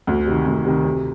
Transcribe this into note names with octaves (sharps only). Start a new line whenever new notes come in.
D2
C3 D#3
D2
C3 D#3
C3